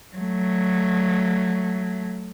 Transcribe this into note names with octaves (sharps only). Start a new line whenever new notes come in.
F#3 A3